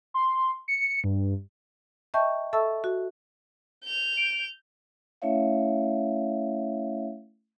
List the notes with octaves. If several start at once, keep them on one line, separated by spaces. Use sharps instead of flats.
C6
C#7
G2
D#5 E5 G5 A5 C#6 G6
A4 E5 A5 C#6 E6
F#4
G6 F7
D7
A3 C#4 E4 C#5 E5 F5